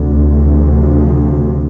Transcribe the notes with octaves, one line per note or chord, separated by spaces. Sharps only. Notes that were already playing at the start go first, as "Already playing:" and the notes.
Already playing: D2 C3
E3
F3